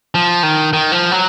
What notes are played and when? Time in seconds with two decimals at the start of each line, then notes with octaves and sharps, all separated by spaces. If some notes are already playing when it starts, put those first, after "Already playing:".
0.15 F3
0.43 D#3
0.73 D#3
0.92 F3
1.12 F#3